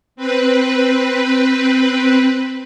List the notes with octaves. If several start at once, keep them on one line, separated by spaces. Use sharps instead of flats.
C4 B4